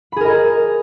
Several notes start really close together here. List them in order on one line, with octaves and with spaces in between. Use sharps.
B5 G#4 A#4 D#5